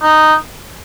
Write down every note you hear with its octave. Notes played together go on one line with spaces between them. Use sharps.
D#4